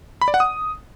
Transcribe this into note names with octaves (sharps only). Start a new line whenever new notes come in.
B5
D5
F#5
D#6